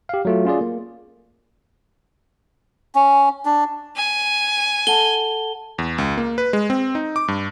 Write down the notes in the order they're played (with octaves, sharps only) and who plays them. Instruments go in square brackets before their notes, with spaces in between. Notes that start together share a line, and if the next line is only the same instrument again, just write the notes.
[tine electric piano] G4 F5
F#3 A3 F4
C#4 F4 G#4 D5
A#3
[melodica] C#4
D4
[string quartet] G#5
[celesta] A4 F#5 A5 [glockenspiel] G7
[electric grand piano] E2
C#2
A#3
B4
G#3
C4
D#4
D6
G2